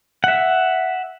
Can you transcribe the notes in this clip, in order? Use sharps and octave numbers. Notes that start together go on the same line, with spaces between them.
E5 F#5